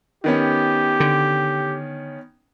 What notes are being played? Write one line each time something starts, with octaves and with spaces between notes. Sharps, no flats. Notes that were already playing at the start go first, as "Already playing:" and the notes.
D#3 B3 C#4 G4
D3